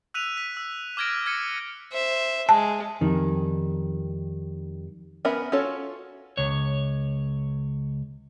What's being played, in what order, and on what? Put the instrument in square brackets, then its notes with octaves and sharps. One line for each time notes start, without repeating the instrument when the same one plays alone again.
[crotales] E6 F#6 B6 D#7 F7
B6
E6
D6 F6 G#6 A#6 D7
F6 G#6 A#6 C#7 D#7
[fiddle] C5 E5
[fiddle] G#3 [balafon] A5
[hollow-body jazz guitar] F2 D#3 G3
[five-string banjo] B3 C#4 A#4 E5 B5
C#4 F4 F#4 A4 C#5
[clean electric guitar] C#2 C#5